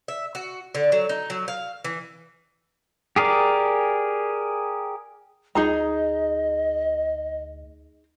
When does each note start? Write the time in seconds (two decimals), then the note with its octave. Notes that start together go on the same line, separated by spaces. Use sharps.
0.08 E5
0.35 F#4
0.75 D3
0.92 F#3
1.09 D#4
1.30 F#3
1.48 F5
1.84 E3
3.16 G4 G#4 A#4 D5
5.55 D2 D#4 G#4 D#5 A#5